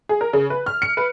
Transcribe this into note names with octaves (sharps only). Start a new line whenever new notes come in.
G#4
A#4
C#3
B4
F6
C#7
B4